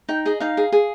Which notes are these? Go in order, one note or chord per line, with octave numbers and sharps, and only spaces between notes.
D#4 G5
G#4 D#5
D#4 F5
G#4
G#4